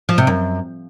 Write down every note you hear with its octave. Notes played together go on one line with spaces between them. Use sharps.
F3
C3
F#2